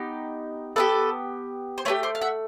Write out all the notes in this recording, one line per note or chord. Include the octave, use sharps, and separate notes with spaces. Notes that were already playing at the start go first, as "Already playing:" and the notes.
Already playing: B3 D#4 G4
B3 D4 G4 A4 B4
C5
A3 D4 G4 B4 C#5
C5 D5
F5
E5 F#5